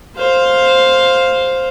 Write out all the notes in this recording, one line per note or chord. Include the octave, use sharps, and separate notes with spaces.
C5 F5